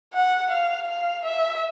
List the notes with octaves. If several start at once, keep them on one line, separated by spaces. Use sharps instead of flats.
F#5
F5
F5
E5